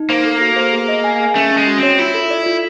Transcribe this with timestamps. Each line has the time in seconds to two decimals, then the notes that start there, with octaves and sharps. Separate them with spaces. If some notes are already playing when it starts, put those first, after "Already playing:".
Already playing: D#4
0.10 A#3 C5
0.25 A4
0.41 F#4
0.56 C5
0.73 G#4
0.89 D#5
1.04 G#5
1.20 G#4
1.35 A3 C#4
1.51 C#4
1.57 G#3
1.67 F#4
1.78 C4 C#5
1.99 E4 F4
2.14 A4
2.31 D5
2.46 F4